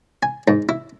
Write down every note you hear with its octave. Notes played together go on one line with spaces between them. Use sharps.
G#5
G#2
E4